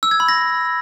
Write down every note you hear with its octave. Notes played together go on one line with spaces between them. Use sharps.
E6
G#6
B5
A#6